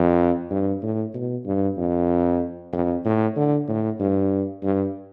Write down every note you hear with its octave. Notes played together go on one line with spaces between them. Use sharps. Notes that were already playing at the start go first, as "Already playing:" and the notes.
Already playing: F2
G2
A2
B2
G2
F2
F2
A2
D3
A2
G2
G2